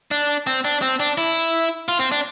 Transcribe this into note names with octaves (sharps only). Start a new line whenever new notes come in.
D4
C4
D4
C4
D4
E4
F4
C4
D4